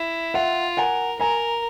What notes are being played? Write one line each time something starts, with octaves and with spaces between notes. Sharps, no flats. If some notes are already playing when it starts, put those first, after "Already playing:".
Already playing: E4
F4 E5 F#5
A#4 F#5 G#5
A#4 G#5 A#5